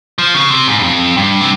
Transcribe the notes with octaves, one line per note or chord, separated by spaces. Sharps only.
F3
C#3
C3
G#2
G2
F2
G2
C3